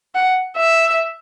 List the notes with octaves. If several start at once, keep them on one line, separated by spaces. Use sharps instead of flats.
F#5
E5